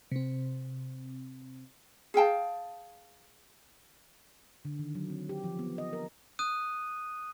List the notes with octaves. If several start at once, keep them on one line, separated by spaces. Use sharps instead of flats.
C3 C4
G#4 F5 G5 A5
D3
D#3
F#3
C4
G4
F3
B3
D#5
A#4
D#6 F#6 D#7